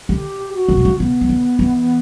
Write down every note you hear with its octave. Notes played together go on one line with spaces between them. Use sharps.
D3 G4
F#4
C#3
B2
C#3
C#3 B3
E3
D3
E3